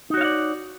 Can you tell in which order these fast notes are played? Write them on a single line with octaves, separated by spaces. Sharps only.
D#4 F#4 C#5 F5 D5